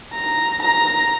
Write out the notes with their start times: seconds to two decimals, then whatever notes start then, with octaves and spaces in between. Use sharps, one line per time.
0.14 A#5
0.62 A#5